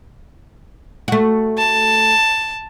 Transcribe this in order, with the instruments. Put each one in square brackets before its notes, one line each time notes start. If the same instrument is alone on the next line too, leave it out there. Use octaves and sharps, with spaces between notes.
[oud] A3 F#4
[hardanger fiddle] A5